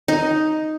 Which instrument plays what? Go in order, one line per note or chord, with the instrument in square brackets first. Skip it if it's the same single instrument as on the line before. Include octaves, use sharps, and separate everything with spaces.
[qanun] D#4